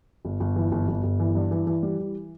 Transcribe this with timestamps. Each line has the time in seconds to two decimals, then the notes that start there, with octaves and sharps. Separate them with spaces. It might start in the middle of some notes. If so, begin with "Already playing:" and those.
0.25 G1
0.40 G1
0.56 E3
0.72 G1
0.88 G1
1.04 G1
1.20 E3
1.35 G2
1.51 E3
1.67 E3
1.83 G3
1.99 E3